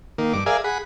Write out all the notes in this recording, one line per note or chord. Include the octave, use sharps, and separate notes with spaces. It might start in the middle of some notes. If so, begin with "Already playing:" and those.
D#3 A#3
G2 D6
G#4 A#4 D5 E5 F5 G#5
G#4 F#5 B5